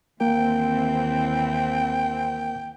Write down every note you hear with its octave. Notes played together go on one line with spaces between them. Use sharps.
D#2 E3 A#3 C4 A#4 G5